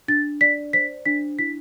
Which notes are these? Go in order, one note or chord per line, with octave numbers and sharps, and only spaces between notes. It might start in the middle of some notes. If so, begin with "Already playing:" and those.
D4 A6
D5 B6
C5 B6
D4 B6
E4 B6